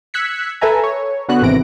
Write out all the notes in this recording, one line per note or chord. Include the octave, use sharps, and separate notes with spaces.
E6 F#6 G#6 B6 C#7
A4 B4 E5 G#5 A#5
C#5
D3 B3 F#4 F#6
G#1 C3 E3 A#6 D7